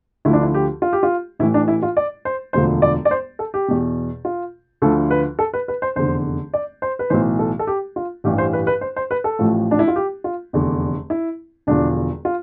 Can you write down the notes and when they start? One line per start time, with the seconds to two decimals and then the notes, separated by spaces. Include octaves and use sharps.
0.25 D2 D3 F3 E4
0.33 D4
0.43 E4
0.54 G4
0.82 F4
0.93 G4
1.03 F4
1.39 A1 A2 E3 E4
1.54 D4
1.68 E4
1.83 F4
1.97 D5
2.25 C5
2.53 E1 D2 D3 F3 C5
2.82 D5
3.05 D5
3.11 C5
3.39 A4
3.54 G4
3.68 E2 B2
4.25 F4
4.82 D2 D3 F3 A4
5.11 B4
5.39 A4
5.53 B4
5.68 B4
5.82 C5
5.96 F1 E2 D3 C5
6.54 D5
6.82 C5
6.99 B4
7.10 B1 A2 E3 C5
7.39 A4
7.59 A4
7.67 G4
7.96 F4
8.24 A1 G2 E3 G4
8.38 C5
8.53 B4
8.67 B4
8.81 C5
8.96 C5
9.11 B4
9.24 A4
9.39 A1 A2 F3
9.71 D4
9.79 E4
9.88 F4
9.96 G4
10.24 F4
10.53 F1 E2 D3
11.10 E4
11.67 E1 E2 D3 F3 D4
12.25 F4